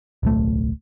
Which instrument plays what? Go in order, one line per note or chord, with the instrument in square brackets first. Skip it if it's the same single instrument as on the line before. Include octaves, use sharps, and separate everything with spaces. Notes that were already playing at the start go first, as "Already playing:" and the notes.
[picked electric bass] D1 B1 A3